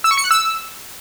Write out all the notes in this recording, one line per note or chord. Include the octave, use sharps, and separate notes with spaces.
E6
C#6
C#7
F#6
E6